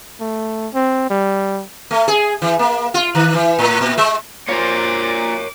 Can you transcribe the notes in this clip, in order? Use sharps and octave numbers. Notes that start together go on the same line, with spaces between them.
A3
C4
G3
A3
G#4
E3
A#3
F4
D#3
E3
A2
A#2
G#3
A#3 F4 A#4 C5 C#5 D6